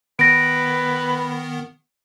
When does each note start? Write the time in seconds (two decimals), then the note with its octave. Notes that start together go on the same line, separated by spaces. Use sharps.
0.19 D#3 B3 B4 A#6 D7